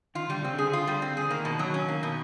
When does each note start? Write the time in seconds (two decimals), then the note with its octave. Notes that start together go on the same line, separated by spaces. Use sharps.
0.15 D#3 F4
0.28 D3 G3
0.41 C#3 C4
0.53 D3
0.58 G#4
0.73 F4
0.87 G3
1.02 C4
1.17 D3 G#4
1.30 D#3 A#3
1.45 B2
1.59 F#3
1.74 C#4
1.88 A#3
2.03 B2